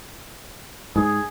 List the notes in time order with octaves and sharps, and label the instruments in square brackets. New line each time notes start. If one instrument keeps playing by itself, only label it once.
[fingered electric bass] G#2 [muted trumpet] G#4